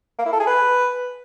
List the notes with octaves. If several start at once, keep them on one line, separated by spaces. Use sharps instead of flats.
A#3
E4
A4
G#4
B4